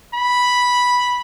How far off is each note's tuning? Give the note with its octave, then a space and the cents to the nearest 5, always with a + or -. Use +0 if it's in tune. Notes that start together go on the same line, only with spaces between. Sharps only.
B5 -5